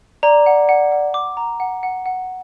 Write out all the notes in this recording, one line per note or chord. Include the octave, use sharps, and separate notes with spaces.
D5 A#5
F#5
F#5
F#5
D6
A#5
F#5
F#5
F#5